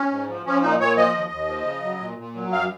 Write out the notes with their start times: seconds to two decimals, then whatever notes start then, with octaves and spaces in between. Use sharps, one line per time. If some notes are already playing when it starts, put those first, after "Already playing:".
Already playing: C#4
0.11 G#2
0.29 F3
0.46 F3 C#4
0.63 A#2 D#4
0.80 A#2 C#5
0.97 F3 D#5
1.14 D#2
1.32 D#2
1.49 F3
1.66 C#3
1.84 F#3
2.00 A#2
2.18 A#2
2.35 F#3
2.51 F#2 F5